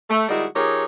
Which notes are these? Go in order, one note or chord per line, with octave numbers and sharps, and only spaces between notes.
A3
D#3 G3 G#3 D#4 E4 F#4
F3 D#4 G4 G#4 A#4 C#5